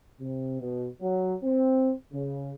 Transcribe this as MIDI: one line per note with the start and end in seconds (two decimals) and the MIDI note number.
0.21 0.55 48
0.60 0.86 47
1.01 1.33 54
1.43 1.92 60
2.13 2.51 49